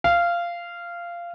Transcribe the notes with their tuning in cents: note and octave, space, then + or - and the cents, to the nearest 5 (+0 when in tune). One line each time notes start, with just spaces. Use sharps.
F5 -15